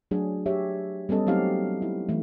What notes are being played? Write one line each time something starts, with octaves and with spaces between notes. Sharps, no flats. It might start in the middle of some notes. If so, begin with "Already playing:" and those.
F#3 A3 D4 G#4
G4 C#5 E5
G3 B3 C#4 A4 D#5
F#3 A3 C4 D#4 G4 F5
E4
E3 A3